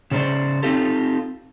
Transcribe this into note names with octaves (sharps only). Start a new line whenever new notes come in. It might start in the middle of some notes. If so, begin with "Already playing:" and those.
C#3 C#4 C5 D5
C4 D#4 F4 G4 A4